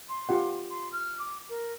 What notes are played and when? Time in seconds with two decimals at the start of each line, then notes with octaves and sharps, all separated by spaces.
0.09 C6
0.29 F4 G4 F#5
0.70 C6
0.92 F6
1.19 D6
1.49 A#4